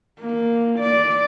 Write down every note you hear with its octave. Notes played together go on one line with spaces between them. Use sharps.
A#3
D5